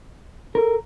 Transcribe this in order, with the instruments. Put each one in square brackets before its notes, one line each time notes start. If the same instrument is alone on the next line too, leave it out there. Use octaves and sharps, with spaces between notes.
[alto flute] A4 [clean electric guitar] A#4